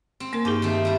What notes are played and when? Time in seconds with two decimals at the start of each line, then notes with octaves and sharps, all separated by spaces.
0.20 C4
0.33 A#3 C4 A#4
0.45 G2 D#4 G4 G#4 F5
0.62 D#3 A3 C4
0.85 G3 E4